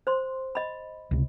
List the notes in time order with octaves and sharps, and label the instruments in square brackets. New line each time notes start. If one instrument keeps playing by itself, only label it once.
[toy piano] C5 C6
D#5 B5
[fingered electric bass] C#2 C3